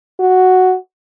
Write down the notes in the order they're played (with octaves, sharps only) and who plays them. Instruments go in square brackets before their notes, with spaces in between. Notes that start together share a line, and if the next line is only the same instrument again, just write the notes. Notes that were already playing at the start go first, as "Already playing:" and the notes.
[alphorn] F#4